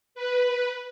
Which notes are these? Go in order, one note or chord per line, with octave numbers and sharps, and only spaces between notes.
B4